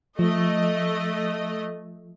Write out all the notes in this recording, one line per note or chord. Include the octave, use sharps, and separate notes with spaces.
F3 A3 D#5